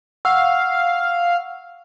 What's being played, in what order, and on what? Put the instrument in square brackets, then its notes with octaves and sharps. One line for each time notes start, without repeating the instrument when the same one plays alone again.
[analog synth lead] F5 [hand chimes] F#5 C#6 E6